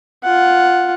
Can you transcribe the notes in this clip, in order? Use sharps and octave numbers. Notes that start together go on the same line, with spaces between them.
F4 F#5